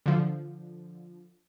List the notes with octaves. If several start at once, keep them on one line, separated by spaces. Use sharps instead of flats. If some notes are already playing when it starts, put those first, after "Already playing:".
D3 F3